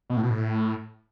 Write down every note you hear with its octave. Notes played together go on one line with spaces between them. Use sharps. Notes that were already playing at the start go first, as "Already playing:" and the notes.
B2
A2
B2
A2